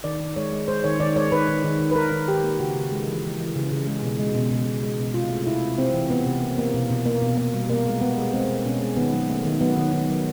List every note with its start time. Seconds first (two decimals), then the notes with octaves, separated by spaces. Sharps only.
0.04 D#3 D5
0.20 D#3
0.36 G#3 C#5
0.52 G#3
0.68 G#3 C5
0.84 D#3 C#5
1.00 D#3 D5
1.16 G#3 C#5
1.32 D#3 B4
1.48 D#3
1.64 D#3
1.80 D#3
1.91 B4
1.96 D#3 A#4
2.11 D#3
2.28 D#3 G4
2.43 A#3
2.59 C#3 F#4
2.75 C#3
2.92 G#3
3.07 E3
3.24 E3
3.39 E3
3.55 C#3
3.71 C#3
3.87 G#3
4.03 B2
4.19 G#3
4.35 B2
4.51 B2
4.67 B2
4.83 G#3
4.99 B2
5.14 C3 F4
5.30 A3
5.47 C3 E4
5.62 C3
5.78 C3 C4
5.94 E3
6.10 E3 B3
6.26 C3
6.42 A#3
6.58 A#3
6.74 B2
6.90 B2
7.06 A#3
7.22 B2
7.37 A#3
7.54 G3
7.69 B2 A#3
7.86 G#3
8.01 G#3 B3
8.18 G#3
8.33 G#3 C4
8.49 B2
8.65 B2 C#4
8.81 G#3
8.97 D#3 B3
9.13 F#3
9.29 A3
9.45 D#3
9.60 F#3 B3
9.77 D#3
9.93 D#3
10.08 F#3